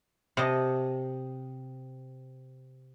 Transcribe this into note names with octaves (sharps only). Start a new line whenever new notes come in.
C3 D#5 A5